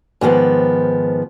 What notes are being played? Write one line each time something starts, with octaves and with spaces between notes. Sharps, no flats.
G#2 D#3 F3 B3